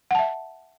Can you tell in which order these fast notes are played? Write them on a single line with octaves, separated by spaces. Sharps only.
F#5 A5 E5